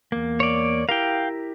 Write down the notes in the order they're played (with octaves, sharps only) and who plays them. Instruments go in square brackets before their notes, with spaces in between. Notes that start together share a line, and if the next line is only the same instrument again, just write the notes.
[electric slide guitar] E2 A#3
[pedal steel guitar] C#5 D5
[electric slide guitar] E4 G4 A#4 [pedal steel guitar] F5 G5